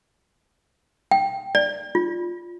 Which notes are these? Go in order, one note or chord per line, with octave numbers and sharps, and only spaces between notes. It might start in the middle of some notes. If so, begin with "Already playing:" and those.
G5
D5
F4